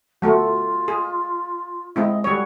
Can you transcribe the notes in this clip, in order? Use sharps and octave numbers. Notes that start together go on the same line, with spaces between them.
F#3 A3 F4 F#4
G#4
G#3 C4 E4 D#5
G3 F#4 C#5